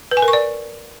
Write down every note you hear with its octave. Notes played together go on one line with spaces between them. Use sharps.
B4
G#5
A#4
C#6
D5